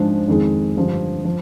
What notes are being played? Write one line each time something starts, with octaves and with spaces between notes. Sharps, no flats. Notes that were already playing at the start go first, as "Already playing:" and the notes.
Already playing: G#2 F3 G#3 D4 G#4
F2 D#3 G#3
G2 D3 F3
F3